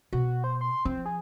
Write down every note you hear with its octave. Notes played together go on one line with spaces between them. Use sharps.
B2 F#4
C5
C6
F3 C4
G#4